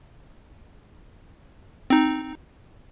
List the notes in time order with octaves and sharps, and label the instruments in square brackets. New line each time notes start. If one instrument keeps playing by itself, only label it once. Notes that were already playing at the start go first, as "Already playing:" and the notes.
[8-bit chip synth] C4 D#4